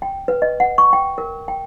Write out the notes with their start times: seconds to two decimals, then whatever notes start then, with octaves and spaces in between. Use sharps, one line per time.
0.02 G5
0.28 B4
0.42 D#5
0.60 F#5
0.78 C#6
0.93 G5
1.18 A#4
1.48 G5